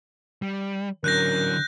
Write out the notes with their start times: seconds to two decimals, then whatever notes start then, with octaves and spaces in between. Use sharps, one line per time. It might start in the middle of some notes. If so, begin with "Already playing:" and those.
0.42 G3
1.04 D3 F#3 C#4 A#4 F#6 G6 A#6